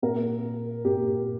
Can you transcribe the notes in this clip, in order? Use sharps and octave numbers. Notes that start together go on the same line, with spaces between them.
A#2 A#4
A#2 G4